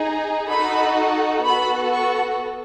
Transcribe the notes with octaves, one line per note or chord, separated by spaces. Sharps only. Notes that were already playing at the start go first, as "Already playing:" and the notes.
Already playing: D#4 G#4
D#4 F#4 A4 B5
B3 F#4 A4 B5
C#6